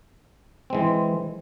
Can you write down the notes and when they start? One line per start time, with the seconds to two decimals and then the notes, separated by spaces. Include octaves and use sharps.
0.70 E3 G#3 C4